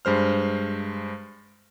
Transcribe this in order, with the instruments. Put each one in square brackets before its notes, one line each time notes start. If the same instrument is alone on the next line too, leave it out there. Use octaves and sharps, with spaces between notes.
[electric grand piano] G2 G#3 C5 F6